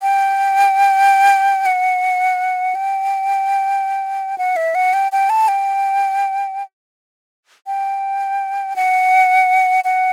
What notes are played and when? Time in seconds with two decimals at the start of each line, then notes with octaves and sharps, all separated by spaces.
0.02 G5
1.66 F#5
2.75 G5
4.38 F#5
4.56 E5
4.75 F#5
4.93 G5
5.12 G5
5.30 A5
5.48 G5
7.67 G5
8.76 F#5
9.84 F#5